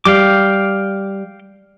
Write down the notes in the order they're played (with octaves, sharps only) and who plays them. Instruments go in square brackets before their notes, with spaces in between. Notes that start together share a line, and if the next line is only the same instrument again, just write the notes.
[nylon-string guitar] G3 [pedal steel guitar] F5 G5 D6